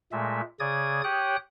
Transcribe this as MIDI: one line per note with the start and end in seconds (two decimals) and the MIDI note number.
0.12 0.41 46
0.12 0.41 56
0.12 0.41 57
0.12 0.41 76
0.60 1.02 49
0.60 1.02 74
0.60 1.02 87
0.60 1.02 92
1.04 1.36 67
1.04 1.36 73
1.04 1.36 79
1.04 1.36 87
1.04 1.36 90